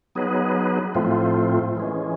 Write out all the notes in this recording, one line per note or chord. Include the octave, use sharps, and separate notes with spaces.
F#3 B3 D#4 G#4 B4
A2 F3 A3 C4 F4
E3 G#3 C#4